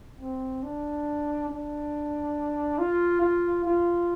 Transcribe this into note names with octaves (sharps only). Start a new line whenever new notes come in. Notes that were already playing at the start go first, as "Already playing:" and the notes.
C4
D4
D4
F4
F4
F4